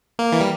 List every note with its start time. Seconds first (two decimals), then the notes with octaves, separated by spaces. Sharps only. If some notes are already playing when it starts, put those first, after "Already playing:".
0.19 A#3
0.32 E3
0.41 G3